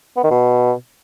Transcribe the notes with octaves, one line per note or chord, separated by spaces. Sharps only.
B3
D#3
B2